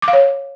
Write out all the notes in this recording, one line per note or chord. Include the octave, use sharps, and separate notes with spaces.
D6
F5
C#5